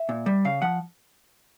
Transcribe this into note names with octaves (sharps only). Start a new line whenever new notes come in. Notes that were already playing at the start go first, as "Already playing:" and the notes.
Already playing: E5
A#2
G3
C#3 F5
F3 F#5